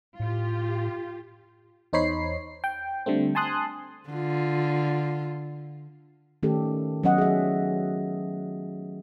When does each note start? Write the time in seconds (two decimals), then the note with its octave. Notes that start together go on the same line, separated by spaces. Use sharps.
0.20 A2 F4 G4
1.93 E2 D#4 C5 C#5 B5 C7
2.64 G5
3.06 D3 G3 A3 C4
3.35 G#5 A5 C6 D#6 F#6
4.10 D3 F4
6.43 D#3 A3 C#4 G4 A4
7.03 F#3 B3 C#4 D#5 F#5
7.18 G#4 E5